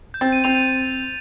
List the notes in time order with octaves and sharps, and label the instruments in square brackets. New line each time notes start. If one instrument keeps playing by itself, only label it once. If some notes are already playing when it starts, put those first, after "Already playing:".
[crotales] G6
[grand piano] C4 [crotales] A6
[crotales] D#7
[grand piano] C4 [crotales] F7
[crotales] D#7